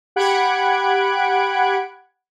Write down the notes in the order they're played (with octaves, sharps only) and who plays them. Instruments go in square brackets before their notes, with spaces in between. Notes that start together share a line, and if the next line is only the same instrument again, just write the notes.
[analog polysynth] G4 F#5 B5 F#6 G#6 D7